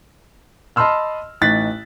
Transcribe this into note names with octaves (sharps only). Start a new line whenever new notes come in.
D#5 A5 B5 C6 E6 F6
A1 D#4 F#6 A6 B6